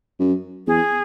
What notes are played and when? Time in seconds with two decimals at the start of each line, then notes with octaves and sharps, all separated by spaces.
0.20 F#2
0.67 E2 G#4